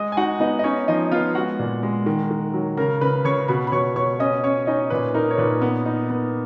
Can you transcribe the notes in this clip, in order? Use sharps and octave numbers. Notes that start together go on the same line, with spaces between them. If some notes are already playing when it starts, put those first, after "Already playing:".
Already playing: G#3 D#5 D#6
G#5
D#4 F#4 F#5
B3 D#4 D#5
D#5
C#4 D#4 C#5
F3 D#4 D#5
B3 F4 F5
G#3 F#4 F#5
A#2
G#3
D#3
D#3
F#3
C#3 A#4 A#5
C#3 B4 B5
C#3 C#5 C#6
B2 B4 B5
B5
B2 C#5 C#6
B2 C#5 C#6
C#4 D#5 D#6
C#4 C#5 C#6
C#4 D#4 D#5
A#2 B4
D#4 A#4
C#5
A#2 B4
B3
D#4
B3